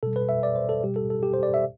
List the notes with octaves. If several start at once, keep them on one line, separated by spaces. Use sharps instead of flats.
B2 G3 A4
B4
E5
D5
C5
A4
B2 G3 G4
A4
A4
G4
C5
D5
E5